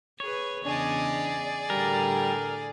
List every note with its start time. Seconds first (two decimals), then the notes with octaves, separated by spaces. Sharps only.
0.20 G#4 B4 C#5
0.65 E2 C#3 D4 G#4 D5 D#5
1.70 A2 D3 G3 A#4